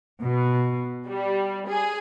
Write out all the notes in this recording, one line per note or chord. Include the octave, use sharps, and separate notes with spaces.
B2
G3
G#4